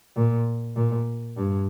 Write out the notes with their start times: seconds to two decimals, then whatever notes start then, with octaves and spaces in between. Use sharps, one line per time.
0.16 A#2
0.76 A#2
1.37 G2